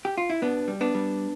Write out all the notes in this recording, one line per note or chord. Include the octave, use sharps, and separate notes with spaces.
G4
F4
E4
B2 B3 D4
G3
B3 D4
G3